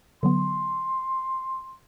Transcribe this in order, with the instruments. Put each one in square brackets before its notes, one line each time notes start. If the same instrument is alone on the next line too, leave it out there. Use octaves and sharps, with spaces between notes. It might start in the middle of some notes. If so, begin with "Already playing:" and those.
[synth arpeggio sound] D3 F#3 B3 [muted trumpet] C6